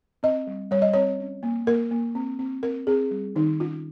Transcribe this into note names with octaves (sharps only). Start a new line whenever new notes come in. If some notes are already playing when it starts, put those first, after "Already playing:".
C4 D#5
G3
G3 C#5
D#5
C4 C#5
C#4
A#3
A#3 A#4
A#3
C4
C4
C4 A#4
C4 G#4
G3
D#3 D#4
C#4 F4